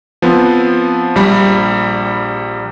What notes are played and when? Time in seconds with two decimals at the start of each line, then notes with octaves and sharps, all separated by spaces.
0.22 F3 B3 C4
1.15 A#1 G3 B5